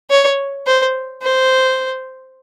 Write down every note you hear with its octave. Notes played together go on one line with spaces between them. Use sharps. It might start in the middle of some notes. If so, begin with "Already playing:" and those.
C#5
C5
C5